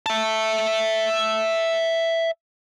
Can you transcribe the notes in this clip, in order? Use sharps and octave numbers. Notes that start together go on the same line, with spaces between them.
E5 A5